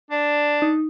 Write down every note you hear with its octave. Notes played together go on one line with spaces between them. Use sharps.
D4
D#4